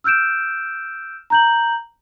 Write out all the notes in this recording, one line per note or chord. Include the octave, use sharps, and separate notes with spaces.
E6 F6 G6 D7 E7
A#5 G6 F#7